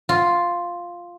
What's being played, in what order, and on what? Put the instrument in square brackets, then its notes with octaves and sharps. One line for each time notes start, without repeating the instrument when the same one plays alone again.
[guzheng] F4